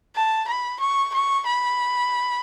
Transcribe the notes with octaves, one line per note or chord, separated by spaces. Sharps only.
A5
B5
C#6
C#6
B5